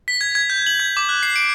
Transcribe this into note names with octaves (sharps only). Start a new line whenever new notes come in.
B6
G#6
G#6
G6
F#7
G#6
D6
F#6
C7
D7